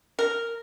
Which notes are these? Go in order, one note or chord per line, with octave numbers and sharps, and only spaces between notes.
A#4